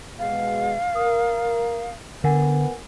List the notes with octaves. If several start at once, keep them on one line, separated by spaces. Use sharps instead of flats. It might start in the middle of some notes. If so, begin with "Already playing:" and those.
B2 G#3 F5
A#4 D#6
D3 B3 A#4 F#5 G#5